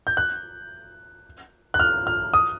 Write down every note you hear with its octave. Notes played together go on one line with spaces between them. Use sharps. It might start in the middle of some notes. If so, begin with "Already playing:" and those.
G6
F#6
F#6
F6
F6
D#6